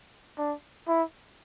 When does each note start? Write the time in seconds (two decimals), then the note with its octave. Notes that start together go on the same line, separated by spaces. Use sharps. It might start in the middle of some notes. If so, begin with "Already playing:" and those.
0.38 D4
0.88 E4